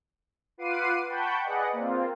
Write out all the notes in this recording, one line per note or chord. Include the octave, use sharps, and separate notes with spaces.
F4 B4 F#5 D6 C7 D#7
F#5 G5 A5 B5 C#6 G6
G#4 B4 D5 D#5 F#5
A#3 C4 F4